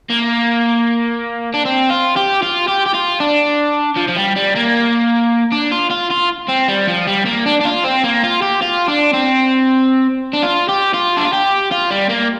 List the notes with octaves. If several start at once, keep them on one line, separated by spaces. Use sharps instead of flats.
A#3
D4
C4
F4
G4
F4
G4
G4
F4
D4
F3
F3
G3
G3
A#3
D4
F4
F4
F4
C4
G3
F3
G3
A#3
D4
D4
F4
C4
A#3
F4
G4
F4
D4
C4
D4
F4
G4
F4
D4
F4
G4
F4
G3
A#3